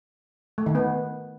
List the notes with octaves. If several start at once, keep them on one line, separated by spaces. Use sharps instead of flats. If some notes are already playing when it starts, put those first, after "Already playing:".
A3
D#3
B3